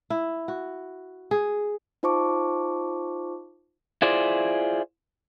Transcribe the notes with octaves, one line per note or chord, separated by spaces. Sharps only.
E4
F#4
G#4
D#4 F4 C5 A5 C#6 D6
E4 F4 G#4 C5 D5